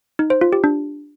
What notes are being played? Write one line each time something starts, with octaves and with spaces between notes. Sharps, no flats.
D#4
C5
F4
G4
D4